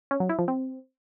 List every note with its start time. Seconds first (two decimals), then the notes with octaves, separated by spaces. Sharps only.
0.11 C#4
0.20 F#3
0.29 E4
0.39 F3
0.48 C4